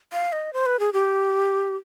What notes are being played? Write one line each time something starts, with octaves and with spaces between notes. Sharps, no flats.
F5
D#5
C5
B4
G#4
G4